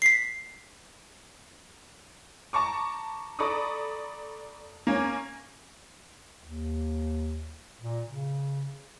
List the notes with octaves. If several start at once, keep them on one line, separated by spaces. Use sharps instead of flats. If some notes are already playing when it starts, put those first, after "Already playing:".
B6 C7
A5 A#5 C#6 D6
A4 D5 A#5 B5 C#6 D#6
A#3 C#4
D#2
A#2
C#3